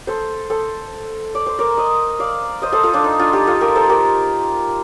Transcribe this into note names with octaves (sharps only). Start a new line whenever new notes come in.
A4 C5
A4 C5
D5
C5
A#4 D5
C5 D#5
D5 F5
C5 D#5
A4 C5
F4 A4
D4 F4
D#4
D4 F4
D#4 G4
F4 A4
G4 A#4
A4 C5
G4 A#4